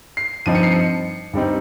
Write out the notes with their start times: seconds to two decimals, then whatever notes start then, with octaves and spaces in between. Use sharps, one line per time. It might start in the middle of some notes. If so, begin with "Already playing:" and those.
0.17 C7
0.46 G2 F3 C4 D#4 D#7
0.55 C#7
0.63 C7
0.72 C#7
1.33 G2 G3 C4 D#4